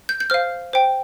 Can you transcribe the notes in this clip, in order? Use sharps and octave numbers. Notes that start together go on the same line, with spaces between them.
G6
G6
C5 F5 F6
C5 G5